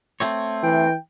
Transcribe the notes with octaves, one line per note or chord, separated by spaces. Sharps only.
A3 C4 C#5
E3 G5